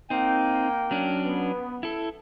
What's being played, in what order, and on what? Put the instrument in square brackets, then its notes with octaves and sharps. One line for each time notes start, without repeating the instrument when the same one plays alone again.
[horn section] A#3 G5 [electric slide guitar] C4 D#4
[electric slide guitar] F#3 C#4 D4
[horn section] B3
[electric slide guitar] E4 A4